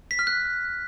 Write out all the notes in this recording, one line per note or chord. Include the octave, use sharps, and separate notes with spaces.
B6
F6
F#6